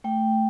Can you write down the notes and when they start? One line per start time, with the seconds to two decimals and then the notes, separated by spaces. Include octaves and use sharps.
0.04 A3 G5